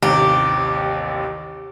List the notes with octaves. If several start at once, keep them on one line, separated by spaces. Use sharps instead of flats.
A1 D#2 C3 G4